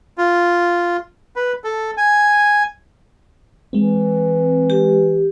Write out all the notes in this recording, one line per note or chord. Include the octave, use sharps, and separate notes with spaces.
F4
B4
A4
G#5
E3 G#3 C4
G4